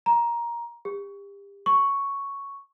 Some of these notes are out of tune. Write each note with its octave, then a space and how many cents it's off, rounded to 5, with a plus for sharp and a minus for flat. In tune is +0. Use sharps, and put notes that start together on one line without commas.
A#5 +15
G4 +35
C#6 +0